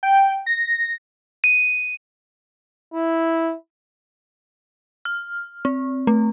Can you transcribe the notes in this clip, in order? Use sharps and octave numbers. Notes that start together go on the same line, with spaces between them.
G5
A#6
D#7
E4
F6
C4
A3